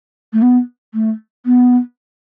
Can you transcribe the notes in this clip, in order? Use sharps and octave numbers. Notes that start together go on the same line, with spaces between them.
A3
B3
A3
B3